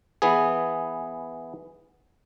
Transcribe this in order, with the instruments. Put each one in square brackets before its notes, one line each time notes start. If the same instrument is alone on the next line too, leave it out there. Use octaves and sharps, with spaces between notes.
[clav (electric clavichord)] E3 B3 G#4